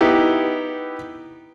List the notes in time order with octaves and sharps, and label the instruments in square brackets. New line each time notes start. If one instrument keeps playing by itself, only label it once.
[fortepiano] B3 D#4 E4 G4